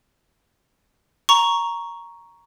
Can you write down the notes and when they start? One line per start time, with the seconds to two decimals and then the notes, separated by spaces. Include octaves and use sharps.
1.29 A#5 C#6